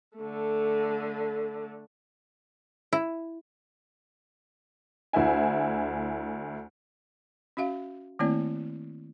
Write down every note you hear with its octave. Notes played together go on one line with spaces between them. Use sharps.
D3 A3
E4
D2 E4 E5 G#5
C#4 F#4 E5 F5
D#3 A3 A#3 C4 E4 D5